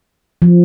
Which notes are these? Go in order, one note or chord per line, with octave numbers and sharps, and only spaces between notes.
F3